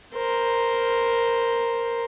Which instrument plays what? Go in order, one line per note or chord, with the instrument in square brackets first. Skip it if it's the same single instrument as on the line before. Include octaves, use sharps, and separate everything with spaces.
[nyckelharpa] A#4 C5